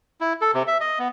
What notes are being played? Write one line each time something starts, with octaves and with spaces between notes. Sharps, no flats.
E4
A4
C3
E5
D#5
B3